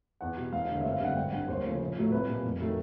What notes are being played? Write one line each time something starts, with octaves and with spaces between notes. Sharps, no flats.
E2 F#5
B2 G3
E1 F5
D#2 D3 G3
G#1 E5
F5
G2 D3 G3 F#5
G#1 G5
G2 D3 F#5
D#2 C5
C#3 F3 A3
A#1
A2 F#3 A3
C2 B4
A#2 G3
F1
D#3 F#3 A3